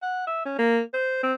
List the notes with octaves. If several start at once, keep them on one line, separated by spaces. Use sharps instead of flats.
F#5
E5
C#4
A#3
C5
C4